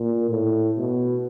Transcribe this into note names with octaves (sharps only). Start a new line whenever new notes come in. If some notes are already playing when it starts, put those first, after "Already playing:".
Already playing: A#2
A2
B2